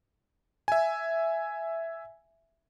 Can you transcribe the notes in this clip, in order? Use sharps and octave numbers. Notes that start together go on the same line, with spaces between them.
E5 G#5